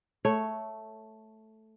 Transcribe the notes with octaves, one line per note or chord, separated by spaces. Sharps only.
A3 C#5